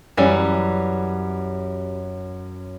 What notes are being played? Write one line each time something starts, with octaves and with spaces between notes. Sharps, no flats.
F#2 E3 G3 C#4